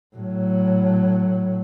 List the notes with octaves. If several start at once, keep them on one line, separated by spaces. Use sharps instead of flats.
A2 F#3